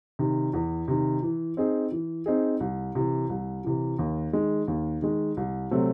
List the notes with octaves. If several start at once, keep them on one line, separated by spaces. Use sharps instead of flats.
C3 D#3
E2
C3 D#3
E3
C4 D#4 G#4
E3
C4 D#4 G#4
C2
C3 E3
C2
C3 E3
D#2
D#3 G#3
D#2
D#3 G#3
C2
C3 F#3 A3 C4